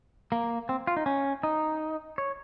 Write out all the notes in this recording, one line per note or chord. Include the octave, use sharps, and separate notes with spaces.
A#3
C4
F4
D#4
C#4
D#4
C#5